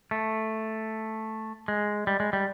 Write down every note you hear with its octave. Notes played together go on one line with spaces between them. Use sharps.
A3
G#3
G3
G#3
G3